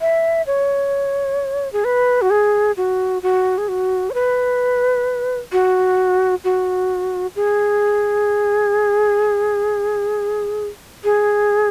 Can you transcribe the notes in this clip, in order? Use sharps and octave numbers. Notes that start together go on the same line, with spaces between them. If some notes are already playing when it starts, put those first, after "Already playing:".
E5
C#5
G#4
B4
F#4
G#4
F#4
F#4
G#4
F#4
C#5
B4
F#4
F#4
G#4
G#4